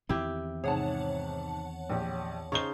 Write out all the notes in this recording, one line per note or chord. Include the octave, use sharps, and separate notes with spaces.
E2 D#3 C4 E4 G4
G#2 C3 G#4 C#5 F#5 A5
A#1 G4
C#3 D#4 C5 C#6 G7